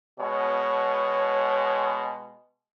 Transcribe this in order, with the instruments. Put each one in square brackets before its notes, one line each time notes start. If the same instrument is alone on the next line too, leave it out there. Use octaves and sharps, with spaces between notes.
[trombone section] B2 G#3 [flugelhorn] C#5